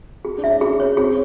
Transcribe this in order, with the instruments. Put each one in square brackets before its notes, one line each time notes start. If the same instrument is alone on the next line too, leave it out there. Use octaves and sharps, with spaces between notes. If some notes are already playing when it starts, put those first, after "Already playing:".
[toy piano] G#4
[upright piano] D4
[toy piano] E5
[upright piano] C#4
[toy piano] G#4
C#5
[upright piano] C4 [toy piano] G#4